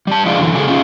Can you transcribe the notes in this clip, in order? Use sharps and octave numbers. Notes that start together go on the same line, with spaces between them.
G3 A5
F3 G#3 D4 F4
D3 E3 F#3
C#3 G#3 G#4 A4
C#4 D#4 F4 G#4